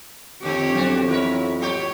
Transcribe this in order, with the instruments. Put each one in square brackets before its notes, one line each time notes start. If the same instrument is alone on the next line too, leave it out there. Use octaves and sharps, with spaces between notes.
[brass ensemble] F2 [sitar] D3 A#3 [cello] G4 C#5
[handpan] F#3 B3 [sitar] C4 D4 F#4
[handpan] E3 [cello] E4 [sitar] F4 A#4 C#5
[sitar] A2 F#3 G4 [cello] C#5